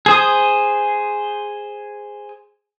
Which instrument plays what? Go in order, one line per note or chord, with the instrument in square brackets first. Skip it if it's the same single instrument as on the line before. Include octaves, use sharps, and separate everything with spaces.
[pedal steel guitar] G#4 C5 D#6